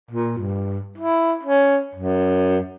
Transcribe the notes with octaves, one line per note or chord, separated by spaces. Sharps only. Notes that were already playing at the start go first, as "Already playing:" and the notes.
A#2
G2
E4
C#4
F#2